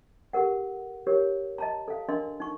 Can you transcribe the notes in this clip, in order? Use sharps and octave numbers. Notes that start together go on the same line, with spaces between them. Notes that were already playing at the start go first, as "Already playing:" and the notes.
G4 A4 A#4 F#5
G4 A#4 C#5
D#5 A5 A#5
A4 F5
D4 A#4 D#5 C6
D#4 C#6